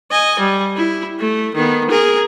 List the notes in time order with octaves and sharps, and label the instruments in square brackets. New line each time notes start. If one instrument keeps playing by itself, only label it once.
[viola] D#5 G#5
G3
E4
A3
D#3 B3
G#4 A#4